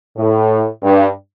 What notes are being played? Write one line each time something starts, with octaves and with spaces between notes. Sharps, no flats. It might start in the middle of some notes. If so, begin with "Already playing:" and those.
A2
G2